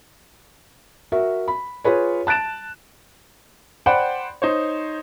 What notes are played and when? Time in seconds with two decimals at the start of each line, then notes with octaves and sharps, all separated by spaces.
1.12 F#4 A#4 E5
1.48 B5
1.84 F4 G#4 B4 C#5
2.27 A5 F#6 A6 D7 E7
3.86 C5 D5 F#5 G5 B5
4.42 D#4 C5 C#5